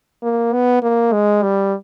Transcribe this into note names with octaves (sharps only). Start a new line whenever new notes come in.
A#3
B3
A#3
G#3
G3